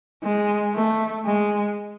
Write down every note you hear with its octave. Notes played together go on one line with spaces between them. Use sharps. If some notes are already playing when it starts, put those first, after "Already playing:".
G#3
A3
G#3